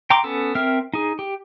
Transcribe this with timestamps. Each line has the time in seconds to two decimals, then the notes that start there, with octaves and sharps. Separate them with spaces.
0.10 G5 A#5 C6 D6
0.24 B3 C#4 A4
0.55 C4 A#4 E5 F6
0.94 D#4 G#4
1.19 G4